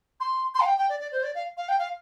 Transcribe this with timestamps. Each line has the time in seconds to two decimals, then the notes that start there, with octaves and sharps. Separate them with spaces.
0.20 C6
0.55 C6
0.60 F5
0.66 G5
0.78 G5
0.89 D5
1.00 D5
1.12 C5
1.23 D5
1.35 F5
1.57 F5
1.69 G5
1.79 F5